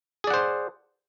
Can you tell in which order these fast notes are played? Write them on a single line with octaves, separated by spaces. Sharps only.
G#4 D5 F#5 C5